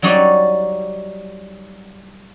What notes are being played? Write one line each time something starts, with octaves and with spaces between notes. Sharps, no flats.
F#3 G3 D#4 F#4 C#5 D5